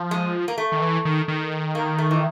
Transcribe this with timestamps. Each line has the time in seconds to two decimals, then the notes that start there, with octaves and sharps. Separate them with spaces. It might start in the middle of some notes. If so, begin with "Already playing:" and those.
Already playing: F3
0.11 G#3
0.48 A#3
0.58 A3
0.72 D#3
0.81 E3
1.05 D#3
1.28 D#3
1.75 A#3
1.98 A3
2.11 E3